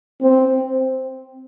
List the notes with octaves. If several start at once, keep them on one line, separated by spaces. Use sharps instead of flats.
C4